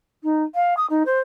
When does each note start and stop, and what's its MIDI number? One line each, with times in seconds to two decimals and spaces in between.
0.23 0.43 63
0.55 0.74 77
0.77 0.86 87
0.90 1.03 63
1.05 1.19 72